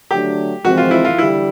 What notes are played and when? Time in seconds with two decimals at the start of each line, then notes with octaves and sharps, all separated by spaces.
0.10 D3 F#3 A3 D4 G4
0.64 F3 G#3 C4 F#4
0.77 F4
0.91 E4
1.05 F4
1.18 D3 G3 E4